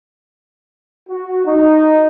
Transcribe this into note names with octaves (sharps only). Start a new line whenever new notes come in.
F#4
D#4